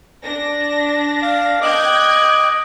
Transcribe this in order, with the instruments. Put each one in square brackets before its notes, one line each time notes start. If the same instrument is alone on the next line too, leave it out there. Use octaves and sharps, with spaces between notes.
[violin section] D4 A#6
[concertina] F5
[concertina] D#5 D6 [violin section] G5 F#6 G#6